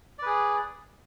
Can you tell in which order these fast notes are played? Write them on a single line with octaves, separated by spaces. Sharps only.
D5 B4 G#4